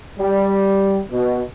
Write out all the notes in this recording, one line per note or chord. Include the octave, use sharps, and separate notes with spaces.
G3
B2